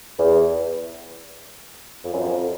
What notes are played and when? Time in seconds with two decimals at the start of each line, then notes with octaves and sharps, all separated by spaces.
0.18 E2
2.04 F2
2.13 F#2
2.21 F2